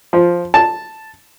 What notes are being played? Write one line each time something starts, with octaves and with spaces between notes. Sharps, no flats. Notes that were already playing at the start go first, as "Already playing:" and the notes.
F3
A5